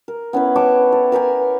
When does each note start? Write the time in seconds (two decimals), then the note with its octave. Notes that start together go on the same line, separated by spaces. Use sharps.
0.08 A#4
0.33 B3 C#4 E4 B4
0.56 C#5 G5 A5 D6
0.92 A4
1.12 A#4 B4 G5 G#5